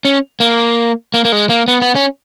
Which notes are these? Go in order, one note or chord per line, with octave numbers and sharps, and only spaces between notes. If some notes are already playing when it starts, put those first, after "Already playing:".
C#4
A#3
A#3
A#3
G#3
A#3
B3
B3
C#4